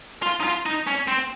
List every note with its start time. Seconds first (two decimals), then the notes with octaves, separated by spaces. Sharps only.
0.22 F4
0.40 D#4
0.44 F4
0.66 D#4
0.87 C#4
1.08 C4